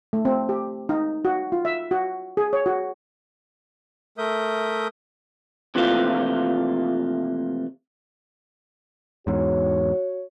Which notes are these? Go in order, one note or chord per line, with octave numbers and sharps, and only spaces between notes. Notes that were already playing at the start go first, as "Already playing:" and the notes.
A3
C4
G4
D#4
F#4
F4
E5
F#4
G#4
C#5
F#4
A3 A#4 E5 D#6 G6
C3 E3 F3 A3 A#3 F4
E2 G#2 F#4 C#5